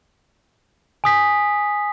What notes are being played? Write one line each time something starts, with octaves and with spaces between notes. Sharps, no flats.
G#5 D#6 B6